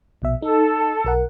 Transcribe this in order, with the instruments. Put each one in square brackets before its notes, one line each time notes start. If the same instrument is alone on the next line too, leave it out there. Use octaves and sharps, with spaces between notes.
[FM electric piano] A#1 B2 E5
[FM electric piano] D#4 [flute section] A4
[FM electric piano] B1 A#4 F#5